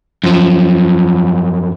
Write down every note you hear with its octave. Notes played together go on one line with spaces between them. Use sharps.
F#2 F3